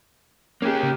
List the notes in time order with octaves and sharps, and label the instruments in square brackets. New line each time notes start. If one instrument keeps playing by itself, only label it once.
[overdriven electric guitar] A#3 G4 [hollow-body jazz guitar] C#4 G#4
[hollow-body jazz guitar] C#3